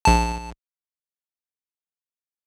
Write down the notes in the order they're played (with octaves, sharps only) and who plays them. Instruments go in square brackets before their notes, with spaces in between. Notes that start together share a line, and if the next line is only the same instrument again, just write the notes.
[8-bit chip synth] A#1 A5